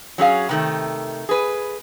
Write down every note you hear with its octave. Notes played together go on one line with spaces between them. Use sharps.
F#3 C#4 G#4 F5
C3 D#3 A3
G#4 B4